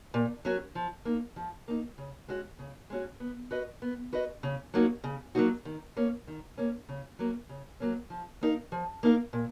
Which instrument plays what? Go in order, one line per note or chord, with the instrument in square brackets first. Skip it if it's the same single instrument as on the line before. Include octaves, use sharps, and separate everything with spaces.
[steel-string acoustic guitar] A#2
F#3 C#4 F#4 A#4
F3
A#3 D#4
F3
A#3 D#4
C#3
G#3 C#4 F#4
C#3
G#3 C#4 F#4
B3
F#4 B4 D#5
B3
F#4 B4 D#5
C#3
F#3 A#3 D#4 F#4
C#3
F#3 A#3 D#4 F#4
D#3
A#3 C#4
D#3
A#3 C#4
C#3
F#3 A#3 C#4
C#3
F#3 A#3 C#4
F3
A#3 D#4 A#4 F5
F3
A#3 D#4 A#4 F5
A#2